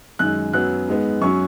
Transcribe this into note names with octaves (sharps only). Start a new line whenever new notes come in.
F#2 D#3 G#3 F#6
F#2 F#3 B3 F#6
G#2 G#3 B3
F#2 F#3 C#4 C#6